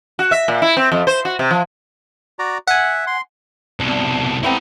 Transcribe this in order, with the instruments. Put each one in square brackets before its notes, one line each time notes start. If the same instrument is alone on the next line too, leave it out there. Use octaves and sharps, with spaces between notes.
[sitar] F#4
E5
A#2
E4
C4
F2
C5
F#4
C3
F3
[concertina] F#4 D5 A#5
[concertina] E5 [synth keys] F#5 G#5
[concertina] C6
[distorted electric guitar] C2 B2 [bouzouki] D4
[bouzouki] A3 B3 C4 [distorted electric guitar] E4 A#5